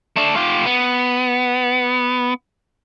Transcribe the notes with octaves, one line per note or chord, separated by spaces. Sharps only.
A3 D4
F4 G4
B3